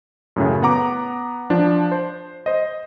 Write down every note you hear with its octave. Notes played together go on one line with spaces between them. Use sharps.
F#2 A2 C#3
B3 F#5 A#5 D6
F3 D4
C5
C5 D#5